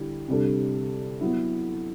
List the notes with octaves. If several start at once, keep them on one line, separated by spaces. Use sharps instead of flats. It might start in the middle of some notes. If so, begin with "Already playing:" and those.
Already playing: D3 G3 E4
C3 G3 D4 A4
F#3 B3 E4